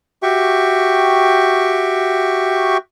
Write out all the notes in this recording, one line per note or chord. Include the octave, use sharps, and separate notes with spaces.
F#4 G4 E5 G5 C#6